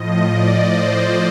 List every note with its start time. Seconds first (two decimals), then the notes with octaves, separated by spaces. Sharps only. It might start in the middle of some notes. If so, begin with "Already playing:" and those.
Already playing: A2 F3 D#5
0.29 D5
0.70 C5